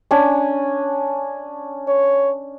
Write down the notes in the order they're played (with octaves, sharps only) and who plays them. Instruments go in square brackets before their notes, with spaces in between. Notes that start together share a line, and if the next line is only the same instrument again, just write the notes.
[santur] C#4 D4 G#5
[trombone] C#5